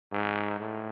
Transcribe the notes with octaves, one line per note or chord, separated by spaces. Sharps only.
G#2
A2